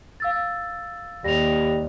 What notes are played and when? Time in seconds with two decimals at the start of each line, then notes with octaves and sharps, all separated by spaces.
0.20 F5 E6 A6
1.24 D#2 G3 A#6 F7